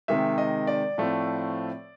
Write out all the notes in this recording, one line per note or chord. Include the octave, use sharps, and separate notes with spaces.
C3 D#3 G#3 E5
D#5
D5
A2 F3 A3 C4